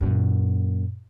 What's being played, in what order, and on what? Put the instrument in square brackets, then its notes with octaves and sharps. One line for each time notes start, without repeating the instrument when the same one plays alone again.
[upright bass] F#2 A#2